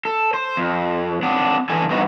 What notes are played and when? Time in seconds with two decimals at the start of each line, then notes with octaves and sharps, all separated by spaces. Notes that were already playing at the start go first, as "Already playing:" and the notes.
0.05 A4
0.34 C5
0.57 F2
1.23 C4 D4 F#5
1.70 D3 E3 A4 G#5
1.90 G2 B3 C4 D#4 F#4